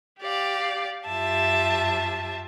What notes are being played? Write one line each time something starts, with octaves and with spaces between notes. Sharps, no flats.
G4 D5 F5
F#2 F4 G4 E5 A5